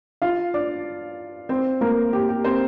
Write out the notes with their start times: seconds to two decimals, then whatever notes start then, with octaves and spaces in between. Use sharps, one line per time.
0.22 F4 F5
0.54 D4 D5
1.49 C4 C5
1.81 A#3 A#4
2.13 G4
2.29 G4
2.44 C4 C5